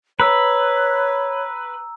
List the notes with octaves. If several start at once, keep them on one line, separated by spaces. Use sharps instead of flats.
B4 C#5 A#5 E6